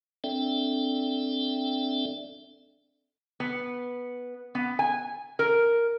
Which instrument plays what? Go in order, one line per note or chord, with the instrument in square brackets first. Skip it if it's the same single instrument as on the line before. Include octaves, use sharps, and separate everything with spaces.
[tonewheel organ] C4 D4 A4 D5 E5 G5
[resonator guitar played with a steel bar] B3
B3
G#5
A#4